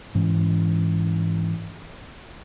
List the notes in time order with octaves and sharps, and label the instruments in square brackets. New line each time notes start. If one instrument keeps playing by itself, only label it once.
[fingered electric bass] G#2 E3 C#4